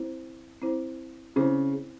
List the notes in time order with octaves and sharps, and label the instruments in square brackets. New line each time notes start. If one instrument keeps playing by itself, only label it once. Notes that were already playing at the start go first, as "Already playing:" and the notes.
Already playing: [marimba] C4 E4 C5
C4 E4 C5
[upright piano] C#3 [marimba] C4 E4 C5